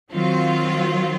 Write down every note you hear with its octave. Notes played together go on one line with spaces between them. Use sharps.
D#3 F#3 C4 F4